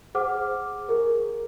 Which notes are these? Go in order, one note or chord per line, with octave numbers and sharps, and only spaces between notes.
G#4 C5 F#5 D6 F6
G#4 A#4